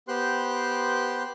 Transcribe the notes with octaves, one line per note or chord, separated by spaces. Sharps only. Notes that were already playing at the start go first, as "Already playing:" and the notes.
B3 G4 C5 G5 C6 F#6